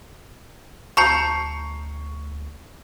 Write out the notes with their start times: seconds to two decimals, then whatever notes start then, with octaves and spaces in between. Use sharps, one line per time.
0.97 D2 A5 A#5 C#6 G6 C7 C#7